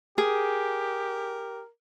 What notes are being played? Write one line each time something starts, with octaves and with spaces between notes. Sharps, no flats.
G4 G#4 A#4